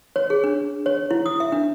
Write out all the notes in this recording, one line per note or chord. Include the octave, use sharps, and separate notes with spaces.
C#5
G#4
D4
C#5
E4
D#6
E5
D4